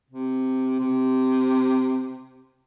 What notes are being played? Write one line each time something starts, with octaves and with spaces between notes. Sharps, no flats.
C3
C3